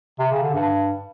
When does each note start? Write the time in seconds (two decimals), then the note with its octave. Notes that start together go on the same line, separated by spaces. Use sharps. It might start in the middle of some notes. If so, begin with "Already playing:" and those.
0.19 C3
0.31 C#3
0.42 D3
0.54 G2